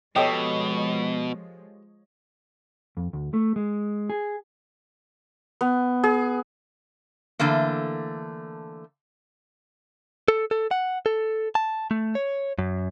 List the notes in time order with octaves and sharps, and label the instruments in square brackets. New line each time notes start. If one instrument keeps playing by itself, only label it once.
[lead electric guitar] B2 [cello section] F3 G#3 [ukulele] G4 A4 A5 [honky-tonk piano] C#5 D#5
[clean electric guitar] F2
D2
A3
G#3
G#4
[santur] B3
G#4
[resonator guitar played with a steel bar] D3 E3 A3 A#3
[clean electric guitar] A4
A4
F#5
A4
A5
A3
C#5
F#2